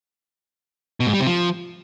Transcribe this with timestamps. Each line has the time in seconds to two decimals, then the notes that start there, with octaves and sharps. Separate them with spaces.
1.00 B2
1.07 G#2
1.13 G3
1.20 C3
1.27 F3